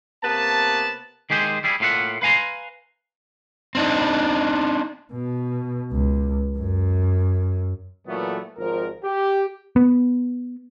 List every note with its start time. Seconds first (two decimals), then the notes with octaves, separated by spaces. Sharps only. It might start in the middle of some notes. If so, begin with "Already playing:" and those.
0.23 C3 A#3 B3 B4 A5
1.30 D#3 G#3 G4 G#4 B4 C5
1.64 G3 E4 G#4
1.80 A2 A#3 F4 E5 F#5
2.22 B4 F5 G#5 A#5 C6
3.75 C4 D4 D#4
5.13 B2
5.92 C#2
6.58 F#2
8.08 A#2 E3 F#3 A3 B3
8.58 G#1 F3 A#4
9.04 G4
9.76 B3